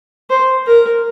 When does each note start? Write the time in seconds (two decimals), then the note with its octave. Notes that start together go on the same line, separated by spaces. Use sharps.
0.30 C5
0.67 A#4